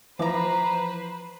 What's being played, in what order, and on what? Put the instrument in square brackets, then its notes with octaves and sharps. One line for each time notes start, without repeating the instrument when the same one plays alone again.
[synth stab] E3 F3 [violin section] B4 C5 [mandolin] A#5 D6